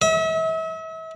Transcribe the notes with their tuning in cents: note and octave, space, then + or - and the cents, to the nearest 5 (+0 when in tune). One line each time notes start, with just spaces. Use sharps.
E5 -40